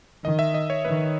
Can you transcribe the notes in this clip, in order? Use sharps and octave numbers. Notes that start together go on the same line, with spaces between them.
D#3 D#5
E5
D#5
C#5
D#3 B4